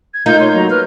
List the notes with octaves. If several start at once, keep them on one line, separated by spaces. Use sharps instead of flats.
G#6
A#3 D#4 F4 G6
C#5 C6
F#3 A#5
B4 F6